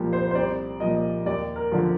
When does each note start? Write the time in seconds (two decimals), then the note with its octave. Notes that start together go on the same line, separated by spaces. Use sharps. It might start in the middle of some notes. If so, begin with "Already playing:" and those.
Already playing: C2 A#2 F3 F4 G4
0.13 C5
0.31 C5
0.35 C2 D5
0.80 A#2 F3 D#5
1.26 D#2 D5
1.56 A#4
1.72 D3 F3